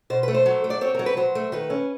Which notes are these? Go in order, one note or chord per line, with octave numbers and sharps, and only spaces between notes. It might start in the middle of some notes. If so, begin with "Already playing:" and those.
B2 C5
A3 B4
C5
F#3
A3
D5
C4 C#5
F#3 A#4
B4
F#3 C5
A3
D#3 B4
C#4